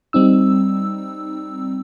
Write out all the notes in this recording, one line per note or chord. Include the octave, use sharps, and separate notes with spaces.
G3 C4 D#4 E6